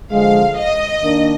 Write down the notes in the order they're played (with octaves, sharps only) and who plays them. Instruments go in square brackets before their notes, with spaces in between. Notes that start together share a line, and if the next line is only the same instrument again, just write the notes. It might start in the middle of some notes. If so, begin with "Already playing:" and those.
[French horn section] D3 F3 G#3 [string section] F5
[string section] D#5
[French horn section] D#3 A#3 D4